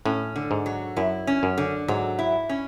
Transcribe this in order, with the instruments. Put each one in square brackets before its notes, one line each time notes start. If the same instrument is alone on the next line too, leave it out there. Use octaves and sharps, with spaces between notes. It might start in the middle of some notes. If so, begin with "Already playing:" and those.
[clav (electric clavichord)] A2 [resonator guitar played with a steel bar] C#4
[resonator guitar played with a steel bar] D3
[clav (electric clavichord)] G#2
[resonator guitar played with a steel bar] F#3
[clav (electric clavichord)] F#2 [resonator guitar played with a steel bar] E4
[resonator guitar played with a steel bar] C#4
[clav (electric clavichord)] F#2
[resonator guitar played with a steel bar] D3
[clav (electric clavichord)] G#2 [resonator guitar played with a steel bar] F#3
[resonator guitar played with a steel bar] E4
C#4